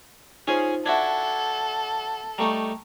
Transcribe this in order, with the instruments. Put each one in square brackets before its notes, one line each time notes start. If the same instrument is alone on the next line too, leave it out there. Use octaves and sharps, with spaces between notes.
[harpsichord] C#4 G#4 G#5 [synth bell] D#4 F4 C5
[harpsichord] D4 E4 F#4 [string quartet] A4 [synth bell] E5 G#6
[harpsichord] G3 A3 D#4 [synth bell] A#5 C#6